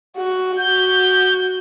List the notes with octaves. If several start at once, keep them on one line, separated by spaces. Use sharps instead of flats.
F#4
F#4 G6